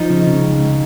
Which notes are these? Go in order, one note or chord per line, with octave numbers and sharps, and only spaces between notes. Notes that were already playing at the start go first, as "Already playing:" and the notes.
Already playing: F3 D#4
C#3
C#3
C#2
C#2